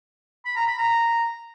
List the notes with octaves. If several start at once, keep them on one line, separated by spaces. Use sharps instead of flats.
B5
A#5
B5
A#5